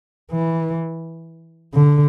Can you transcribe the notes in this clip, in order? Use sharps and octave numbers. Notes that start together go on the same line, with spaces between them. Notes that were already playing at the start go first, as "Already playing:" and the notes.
E3
D3